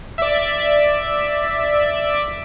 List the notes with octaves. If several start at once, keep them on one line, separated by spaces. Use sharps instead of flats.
D5 E5